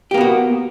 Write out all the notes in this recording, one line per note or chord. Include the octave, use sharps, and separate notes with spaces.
A#3 B3 F#4 G4